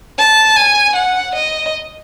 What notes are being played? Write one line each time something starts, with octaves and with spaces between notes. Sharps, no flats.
A5
G#5
F#5
D#5